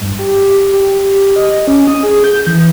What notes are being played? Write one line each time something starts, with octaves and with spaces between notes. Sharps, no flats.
G2
G4
G4
D#5
C#4
D#6
G#4
G6
E3